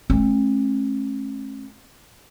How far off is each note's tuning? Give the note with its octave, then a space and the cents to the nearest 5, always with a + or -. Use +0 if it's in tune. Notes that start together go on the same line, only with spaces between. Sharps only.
A3 -45 C#4 -45